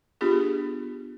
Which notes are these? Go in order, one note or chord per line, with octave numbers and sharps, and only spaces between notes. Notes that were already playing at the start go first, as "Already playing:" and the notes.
B3 D4 F4 G4 G#4